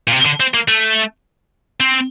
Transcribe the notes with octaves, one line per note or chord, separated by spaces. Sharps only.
A#2
C3
D3
C4
A#3
A3
C4